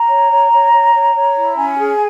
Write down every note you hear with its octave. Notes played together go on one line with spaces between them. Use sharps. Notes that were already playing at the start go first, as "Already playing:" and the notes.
Already playing: A#5
C#5
C#5
C#5
C#5
C#5
C#5
E4
C#4 G#5
G#4